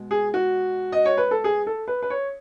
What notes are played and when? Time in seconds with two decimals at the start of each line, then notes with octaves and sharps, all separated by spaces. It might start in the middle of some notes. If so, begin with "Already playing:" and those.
Already playing: B2 G#3
0.11 G#4
0.34 F#4
0.92 D#5
1.05 C#5
1.17 B4
1.31 A4
1.44 G#4
1.67 A4
1.88 B4
2.02 B4
2.10 C#5